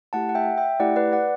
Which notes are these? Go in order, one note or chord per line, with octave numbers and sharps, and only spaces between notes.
A3 E4 G4 F#5 A5
F#5
E5 G5
E5 G5
A3 E4 G4 D5 F#5
B4 D5
D5 F#5